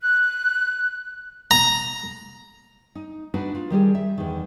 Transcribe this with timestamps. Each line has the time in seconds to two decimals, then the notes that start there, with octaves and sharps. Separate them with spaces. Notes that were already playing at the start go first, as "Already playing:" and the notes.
0.01 F#6
1.51 A#5
2.95 D#4
3.34 D4 D#4 F#4 B4
3.55 F4
3.70 D#3 G3 G4 G#4
3.95 E5
4.18 E2 D#3